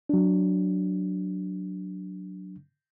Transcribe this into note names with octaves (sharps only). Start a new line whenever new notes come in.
F#3 D4